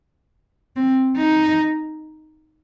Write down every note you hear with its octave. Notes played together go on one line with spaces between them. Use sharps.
C4
D#4